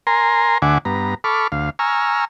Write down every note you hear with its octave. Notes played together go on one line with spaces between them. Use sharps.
A#4 G#5 A#5 C6
D2 D3 E5 F#5 G#5 D6
G2 B3 A#5
A4 B5 C#6 D6 F6
D2 F5
G#5 A#5 C#6 E6 F6